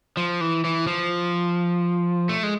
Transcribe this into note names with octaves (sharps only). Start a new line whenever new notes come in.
F3
E3
E3
F3
A3
G#3